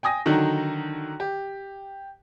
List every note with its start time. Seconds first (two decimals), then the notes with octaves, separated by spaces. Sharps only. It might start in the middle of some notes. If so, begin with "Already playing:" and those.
0.03 G5 G#5 D#6 A#6
0.26 D3 D#3 F#3 D#4 F#4
1.20 G4